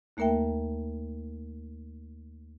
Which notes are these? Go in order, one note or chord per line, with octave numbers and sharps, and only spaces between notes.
D#2 A3 A#3 A#4 E5 G5